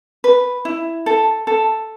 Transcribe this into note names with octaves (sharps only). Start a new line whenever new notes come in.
B4
E4
A4
A4